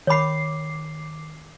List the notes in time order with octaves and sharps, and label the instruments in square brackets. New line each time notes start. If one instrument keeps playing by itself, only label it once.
[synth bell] D#3 D6 C7 [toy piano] C#5 B5